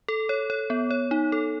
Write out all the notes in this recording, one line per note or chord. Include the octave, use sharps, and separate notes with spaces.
A4
C#5
C#5
B3
C#5
D#4
A4